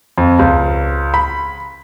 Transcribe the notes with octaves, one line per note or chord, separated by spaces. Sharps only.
F2
C#2
B5